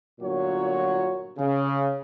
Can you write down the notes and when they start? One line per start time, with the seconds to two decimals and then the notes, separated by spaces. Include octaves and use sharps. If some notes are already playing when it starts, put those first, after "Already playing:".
0.20 G1 A#2 F#3 F#4 C#5
1.38 C#3